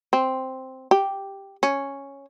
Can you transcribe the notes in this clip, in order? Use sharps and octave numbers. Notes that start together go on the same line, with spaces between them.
C4
G4
C#4